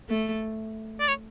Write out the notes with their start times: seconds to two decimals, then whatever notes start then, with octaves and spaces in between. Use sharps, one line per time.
0.09 A3
1.00 D5
1.08 C#5